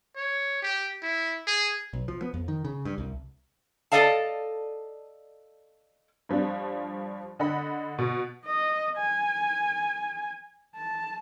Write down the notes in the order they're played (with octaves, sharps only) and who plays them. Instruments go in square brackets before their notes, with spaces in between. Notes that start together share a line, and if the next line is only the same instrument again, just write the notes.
[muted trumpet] C#5
G4
E4
G#4
[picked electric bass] B1
F3
B3
F2
D#3
C#3
G2
C2
[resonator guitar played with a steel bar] A4 A#4 D5 D#5 F5 A5
[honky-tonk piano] G2 F3 G3 D4
D3 D#5 F#5 B5
B2
[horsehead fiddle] D#5
G#5
A5